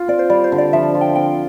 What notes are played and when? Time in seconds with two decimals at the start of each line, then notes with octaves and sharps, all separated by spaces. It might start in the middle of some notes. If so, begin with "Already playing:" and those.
Already playing: F4
0.08 C4 D5
0.19 C5
0.29 G3 D5
0.44 C5
0.52 D3
0.58 D5
0.73 F3 E5
0.95 F4
1.01 G5
1.15 C4 G5